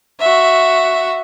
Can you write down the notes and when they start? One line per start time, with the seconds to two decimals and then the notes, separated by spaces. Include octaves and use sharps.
0.20 F#4 E5